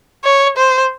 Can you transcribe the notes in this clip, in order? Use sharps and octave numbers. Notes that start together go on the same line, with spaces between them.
C#5
C5